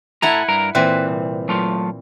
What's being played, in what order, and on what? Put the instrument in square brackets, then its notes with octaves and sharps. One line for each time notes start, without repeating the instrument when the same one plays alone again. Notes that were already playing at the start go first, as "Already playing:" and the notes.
[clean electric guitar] A2 A4 A#5 [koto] E4 F#5 G#5
[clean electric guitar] G2 A#4 A#5
[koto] A#2 E3 C4 [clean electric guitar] B4
[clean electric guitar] C2
F#3 A3 F4